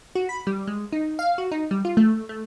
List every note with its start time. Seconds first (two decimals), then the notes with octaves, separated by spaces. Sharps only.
0.15 F#4
0.29 B5
0.47 G3
0.67 G#3
0.93 D#4
1.19 F5
1.38 F#4
1.52 D#4
1.71 G3
1.85 F4
1.97 A3
2.29 A3